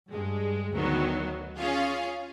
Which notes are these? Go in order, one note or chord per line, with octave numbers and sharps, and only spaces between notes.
G2 G#3
D2 D#3 F#3 B3
C#4 F4 G#4 F5